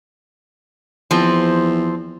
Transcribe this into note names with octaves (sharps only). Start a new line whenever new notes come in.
E2 F3 C4